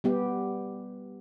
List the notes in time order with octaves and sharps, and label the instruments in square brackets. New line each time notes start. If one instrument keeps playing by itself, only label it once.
[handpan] G3 B3 G4